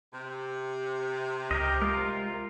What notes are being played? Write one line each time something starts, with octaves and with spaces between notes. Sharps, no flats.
C3
C#2 G4 A#4 D#5
G#3 F4 A#4